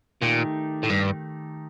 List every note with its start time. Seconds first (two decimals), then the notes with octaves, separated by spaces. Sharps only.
0.22 A#2 D#3 A3 D#4 G4
0.83 A2
0.90 G2